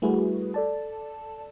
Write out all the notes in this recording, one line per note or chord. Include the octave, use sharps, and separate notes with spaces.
G3 A3 E4 F#4 G#4 B4
A4 D5 A5